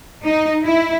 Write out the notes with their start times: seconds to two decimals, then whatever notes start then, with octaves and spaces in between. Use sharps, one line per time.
0.25 D#4
0.65 E4